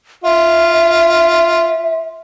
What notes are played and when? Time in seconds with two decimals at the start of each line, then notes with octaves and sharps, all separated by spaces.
0.24 F4 E5